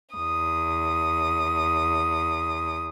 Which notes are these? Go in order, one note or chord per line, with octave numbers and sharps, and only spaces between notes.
E2 D#6